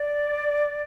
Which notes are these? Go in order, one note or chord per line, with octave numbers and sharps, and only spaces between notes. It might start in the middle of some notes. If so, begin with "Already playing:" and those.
Already playing: D5